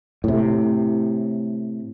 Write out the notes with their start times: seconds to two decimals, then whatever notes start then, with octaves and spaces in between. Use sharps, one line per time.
0.24 A2 C3